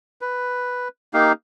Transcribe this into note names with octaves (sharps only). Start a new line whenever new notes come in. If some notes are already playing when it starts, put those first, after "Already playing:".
B4
A#3 D#4 G4 F5